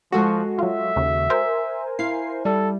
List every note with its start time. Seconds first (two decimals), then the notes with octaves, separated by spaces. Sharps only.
0.12 F3 G#3 F#4 A4 F#5
0.59 F#3 F4 E5
0.96 D#2 C#3
1.30 A#4 C5 G#5
1.99 E4 F5 C7
2.45 G3 A4